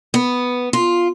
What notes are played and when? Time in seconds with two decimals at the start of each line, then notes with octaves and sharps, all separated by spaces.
0.14 B3
0.73 F4